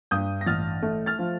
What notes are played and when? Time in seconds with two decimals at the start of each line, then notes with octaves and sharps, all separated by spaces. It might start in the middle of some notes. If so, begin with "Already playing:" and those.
0.11 G2 D#6 G6
0.41 A#6
0.46 A1 F6 A6
0.82 A3
1.06 F6 A6
1.19 F3